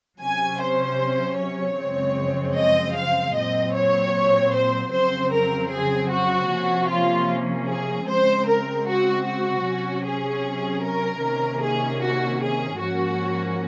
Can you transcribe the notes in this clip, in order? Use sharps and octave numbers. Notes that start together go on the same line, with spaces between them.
C3 F#3 C#4 G#5
C5
C#5
F#2 C#3 F3 G#3 C4
D#5
F5
A#2 F#3 C4 D#5
C#5
C5
F2 C#3 F#3 C4 C5
A#4
G#4
F#4
C3 F3 A#3 C#4
F4
G#4
C#3 G#3 C4 C5
A#4
F#4
F#4
C3 F#3 C#4
G#4
A#4
C3 D#3 A#3 C#4
G#4
F#4
G#4
G#2 F3 A#3 C#4 F#4